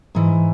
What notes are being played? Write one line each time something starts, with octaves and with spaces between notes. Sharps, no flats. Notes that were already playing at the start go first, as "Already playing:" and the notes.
G#2 E3